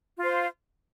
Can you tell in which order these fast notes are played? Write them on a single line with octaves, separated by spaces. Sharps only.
F4 F5 C5